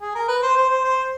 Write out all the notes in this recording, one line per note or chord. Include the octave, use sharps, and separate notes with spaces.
G#4
A#4
B4
C5
C5
C5
C5